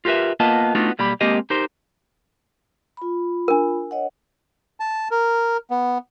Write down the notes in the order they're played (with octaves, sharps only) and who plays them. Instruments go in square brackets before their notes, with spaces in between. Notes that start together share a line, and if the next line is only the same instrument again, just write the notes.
[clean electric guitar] F4 G4 A#4 B4 E5
A#3 B3 F4 A#4 D#5 A5
A3 B3 D4 D#4 F4 F#4
B1 G3 A#3 G4 B5
G#3 A#3 C4 G4 D#5
D#4 G4 A#4 C5
[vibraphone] F4 B5
[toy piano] D4 A#4
[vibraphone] C#5 D#5 F#5
[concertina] A5
A#4
B3